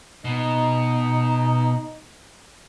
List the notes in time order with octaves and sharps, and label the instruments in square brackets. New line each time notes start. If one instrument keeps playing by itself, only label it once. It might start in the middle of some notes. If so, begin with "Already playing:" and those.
[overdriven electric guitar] B2 [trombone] D#4